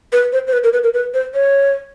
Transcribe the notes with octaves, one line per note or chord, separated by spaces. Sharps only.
B4
C5
C5
B4
A#4
B4
A#4
B4
C5
C#5